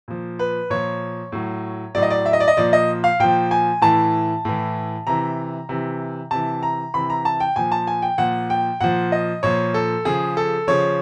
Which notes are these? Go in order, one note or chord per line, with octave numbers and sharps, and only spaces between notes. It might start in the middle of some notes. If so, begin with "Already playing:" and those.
A#2 F3
B4
A#2 F3 C#5
A2 F#3
A2 F#3 D5
D#5
D5
E5
D#5
D5
D#5
A#2 F3 D5
D#5
F5
A#2 F3 G5
G#5
A2 E3 A5
A2 E3
C3 E3 A#5
C3 E3
C3 E3 A5
A#5
C3 E3 B5
A#5
A5
G5
A#2 F3 G#5
A5
G#5
G5
A#2 F3 F#5
G5
A#2 F3 F#5
D#5
A#2 F3 C#5
A4
C#3 F3 G#4
A4
C#3 F3 C#5